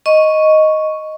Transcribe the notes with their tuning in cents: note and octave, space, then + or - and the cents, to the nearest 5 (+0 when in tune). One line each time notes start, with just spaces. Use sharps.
D#5 +0 C#6 +0